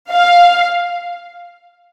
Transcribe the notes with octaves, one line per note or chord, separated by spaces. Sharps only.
F5